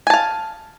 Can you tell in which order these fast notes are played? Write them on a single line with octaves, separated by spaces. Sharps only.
G#5 A5 F5